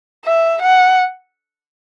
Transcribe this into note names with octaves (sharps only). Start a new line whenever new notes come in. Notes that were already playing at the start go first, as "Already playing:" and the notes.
E5
F#5